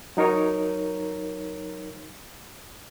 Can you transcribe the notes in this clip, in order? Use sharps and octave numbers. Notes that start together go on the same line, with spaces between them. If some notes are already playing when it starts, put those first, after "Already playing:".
F#3 D#4 A#4 C#5